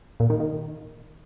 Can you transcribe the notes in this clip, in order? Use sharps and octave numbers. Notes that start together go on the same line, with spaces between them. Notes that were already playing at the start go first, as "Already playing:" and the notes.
A#2
D#3
D#3